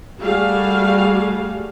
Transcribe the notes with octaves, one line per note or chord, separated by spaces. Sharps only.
G3 A3 F#4 G#4 F5